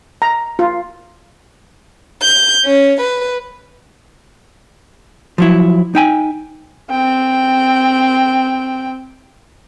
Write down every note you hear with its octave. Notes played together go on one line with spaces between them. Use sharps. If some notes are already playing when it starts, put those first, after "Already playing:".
A#5
F4
G6
C#4
B4
F3 F#3 E4
D#4 G5 G#5
C4 G5